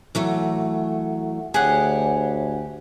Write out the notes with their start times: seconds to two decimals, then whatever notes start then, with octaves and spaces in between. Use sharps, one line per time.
0.15 E3 F#3 A3 A4 E5 F#5
1.54 D2 G4 G#4 C#5 F#5 G#5